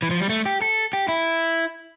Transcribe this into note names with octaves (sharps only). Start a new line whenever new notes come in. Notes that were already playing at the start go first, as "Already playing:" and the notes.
E3
F3
G3
A3
G4
A4
G4
E4